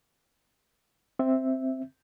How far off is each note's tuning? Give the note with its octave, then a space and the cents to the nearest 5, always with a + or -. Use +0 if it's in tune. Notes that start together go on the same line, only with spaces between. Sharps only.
C4 +0 E5 +0